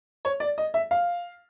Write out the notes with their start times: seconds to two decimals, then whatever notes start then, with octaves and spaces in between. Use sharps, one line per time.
0.25 C#5
0.40 D5
0.58 D#5
0.74 E5
0.91 F5